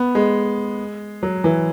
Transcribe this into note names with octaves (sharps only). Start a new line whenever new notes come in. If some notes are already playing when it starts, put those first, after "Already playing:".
Already playing: B3
G#3
F#3
E3